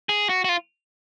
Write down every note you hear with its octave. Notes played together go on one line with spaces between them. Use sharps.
G#4
F#4
F#4
F4